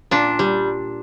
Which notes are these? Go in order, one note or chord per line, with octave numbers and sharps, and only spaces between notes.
A#2 D4
G3